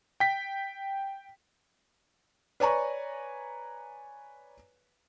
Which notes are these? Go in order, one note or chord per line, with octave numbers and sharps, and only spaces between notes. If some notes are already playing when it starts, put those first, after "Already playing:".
G5 B6
B4 C#5 D5 G#5 A#5 C#6